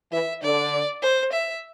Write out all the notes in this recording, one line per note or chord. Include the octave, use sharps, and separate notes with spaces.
E3 E5
D3 D5
C5
E5